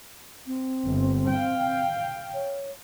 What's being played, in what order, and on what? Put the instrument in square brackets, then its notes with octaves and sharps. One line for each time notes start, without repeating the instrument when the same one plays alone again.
[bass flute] C4
[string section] G1
F5 G5
[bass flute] C#5